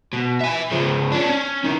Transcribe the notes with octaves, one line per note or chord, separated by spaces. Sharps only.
B2
E5 G#5
C#3 F3
C#4 D4
C#4
D#3 E3